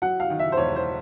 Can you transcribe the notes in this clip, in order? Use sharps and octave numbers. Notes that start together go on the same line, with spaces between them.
F#3 F#5
F5
D#3
E5
C5
E1 C#5
C5